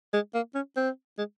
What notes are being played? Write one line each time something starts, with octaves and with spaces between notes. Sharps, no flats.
G#3
A#3
C#4
C4
G#3